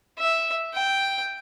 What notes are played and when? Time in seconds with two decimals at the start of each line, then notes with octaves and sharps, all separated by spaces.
0.19 E5
0.74 G5